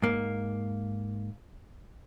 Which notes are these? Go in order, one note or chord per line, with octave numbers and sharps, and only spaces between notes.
G#2 A#3